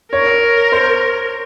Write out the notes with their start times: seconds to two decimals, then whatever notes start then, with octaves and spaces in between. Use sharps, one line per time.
0.12 A#4 C#5
0.72 C5